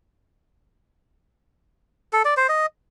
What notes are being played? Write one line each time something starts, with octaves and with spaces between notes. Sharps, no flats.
A4
D5
C5
D#5